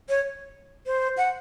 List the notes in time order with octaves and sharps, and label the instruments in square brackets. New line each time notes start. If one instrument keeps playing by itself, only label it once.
[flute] C#5
C5
F#5